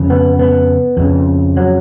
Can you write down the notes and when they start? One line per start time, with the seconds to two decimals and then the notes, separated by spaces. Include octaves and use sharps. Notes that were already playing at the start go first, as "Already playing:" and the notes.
Already playing: F2 C#3
0.10 B3
0.39 B3
0.97 F2 C#3
1.57 F#3